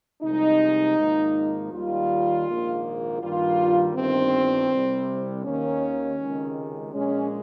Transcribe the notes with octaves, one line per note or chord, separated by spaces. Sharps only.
C2 C3 F3 G#3 D#4
G#1 G#2 F3 A#3
D#2 D#3 G3 F4
A#1 G#2 D#3 A#3
G2 D#3 G3 A#3 F4
G1 G2 D#3 C4
C2 C3 G3
D#2 D#3 A#3 C#4
C#2 C3 D#3 G#3
A#1 A#2 G#3 C#4